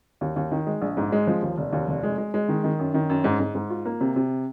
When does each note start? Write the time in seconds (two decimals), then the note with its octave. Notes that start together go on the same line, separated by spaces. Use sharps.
0.21 D#2
0.36 D#2
0.51 D#3
0.67 G#3
0.82 A#1
0.97 G#2
1.12 G#3
1.27 F3
1.42 D#2
1.58 F1
1.72 D#2
1.88 F1
2.03 G#3
2.18 G#3
2.34 G#3
2.48 D#3
2.64 D#3
2.79 F#2
2.94 D#3
3.10 F#2
3.24 G#2
3.40 G#2
3.55 G#2
3.70 F4
3.85 A#3
4.01 C3
4.16 C3